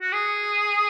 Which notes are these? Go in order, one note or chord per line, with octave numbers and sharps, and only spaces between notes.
F#4
G#4